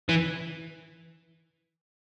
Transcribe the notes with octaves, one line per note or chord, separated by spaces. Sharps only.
E3